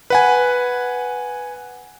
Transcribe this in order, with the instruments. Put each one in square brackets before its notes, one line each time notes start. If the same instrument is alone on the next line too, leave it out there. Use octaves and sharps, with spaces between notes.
[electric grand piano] B4 F#5 G#5